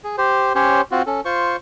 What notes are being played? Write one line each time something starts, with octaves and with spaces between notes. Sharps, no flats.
G#4
G4 C5
C#4 G4 C5 C#5
C4 F4 F#4
C#4 A4
F4 C5 C#6